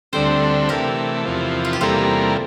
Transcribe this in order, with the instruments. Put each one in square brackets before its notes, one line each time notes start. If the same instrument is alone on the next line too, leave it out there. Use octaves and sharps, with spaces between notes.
[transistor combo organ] D2 D3 G3 C4 [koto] A4 C5
[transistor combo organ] C3 E3 A3 [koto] G4 A#4
[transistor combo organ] E2 C3 F3
[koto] F4
G4
[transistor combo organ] E2 C3 G3 A#3 [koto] F4 A4